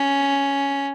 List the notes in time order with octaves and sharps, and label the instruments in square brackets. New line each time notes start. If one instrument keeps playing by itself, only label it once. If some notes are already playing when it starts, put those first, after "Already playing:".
Already playing: [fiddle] C#4